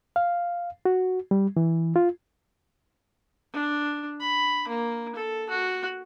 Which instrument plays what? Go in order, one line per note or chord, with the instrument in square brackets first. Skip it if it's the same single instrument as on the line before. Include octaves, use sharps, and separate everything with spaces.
[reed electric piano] F5
F#4
G3
E3
F4
[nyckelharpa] D4
B5
A#3
A4
F#4